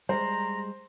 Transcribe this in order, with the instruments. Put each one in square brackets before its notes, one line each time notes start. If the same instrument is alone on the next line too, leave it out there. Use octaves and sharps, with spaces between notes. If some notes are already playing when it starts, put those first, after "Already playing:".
[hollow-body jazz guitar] G3 G#3 [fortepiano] C5 [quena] A#5 [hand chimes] C6